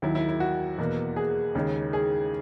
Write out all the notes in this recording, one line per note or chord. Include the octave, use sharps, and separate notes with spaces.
D#2 D#3 F#3 E4
E4
E4
F#4
E2 B2 A#3
G#4
D#2 C#3 G#3 C#4
G#4